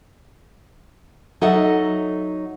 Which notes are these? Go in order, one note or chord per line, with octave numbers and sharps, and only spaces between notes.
F#3 D#4 A4 D#5 E5 F#5